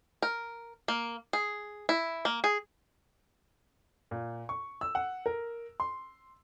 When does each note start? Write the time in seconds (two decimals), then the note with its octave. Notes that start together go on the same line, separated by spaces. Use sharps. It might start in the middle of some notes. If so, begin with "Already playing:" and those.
0.22 A#4
0.88 A#3
1.33 G#4
1.89 E4
2.25 A#3
2.44 G#4
4.11 A#2
4.49 C#6
4.81 E6
4.95 F#5
5.26 A#4
5.80 C6